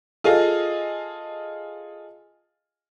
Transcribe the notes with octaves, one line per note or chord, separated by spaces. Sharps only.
F4 G#4 A4 D#5 F5